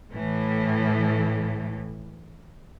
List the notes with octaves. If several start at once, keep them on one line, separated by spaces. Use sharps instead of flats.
A2 E3